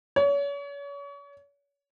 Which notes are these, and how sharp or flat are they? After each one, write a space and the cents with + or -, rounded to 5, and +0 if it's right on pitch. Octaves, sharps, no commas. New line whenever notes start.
C#5 +35